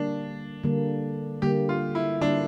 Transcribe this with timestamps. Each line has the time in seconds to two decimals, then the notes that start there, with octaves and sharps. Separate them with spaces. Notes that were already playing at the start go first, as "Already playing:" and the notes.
Already playing: D3 G3 A#3 D4
0.64 D3 G3 A#3
1.42 D3 G3 A#3 G4
1.69 F4
1.95 E4
2.21 D3 G3 A#3 D4